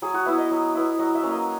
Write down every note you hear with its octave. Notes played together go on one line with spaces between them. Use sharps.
F#3 G#4
F#4
B3 E4 E5
D#5
F#3
B3 E4
F#3 D#5
E5
A#3 C#4
D#5